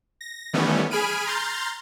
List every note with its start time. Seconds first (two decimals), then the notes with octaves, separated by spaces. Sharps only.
0.21 A#6
0.53 D#3 E3 G3 A3 B3 C#4
0.91 G#4 G#5 B5 F6 D7 D#7
1.27 A#5 C6 F6 G6 A6